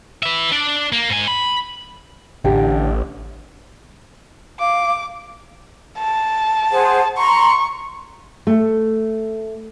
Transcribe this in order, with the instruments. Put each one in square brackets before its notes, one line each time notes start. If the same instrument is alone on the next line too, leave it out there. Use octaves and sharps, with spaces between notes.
[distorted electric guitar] B4 E5
D4 D5
A#3
G#2 G#5
B5
[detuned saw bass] A1 [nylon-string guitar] D3 G4 G5
[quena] F5 [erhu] D6
[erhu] A5
[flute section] G#4 C5 F#5
[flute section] A#5 C6 [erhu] C#6
[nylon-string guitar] A3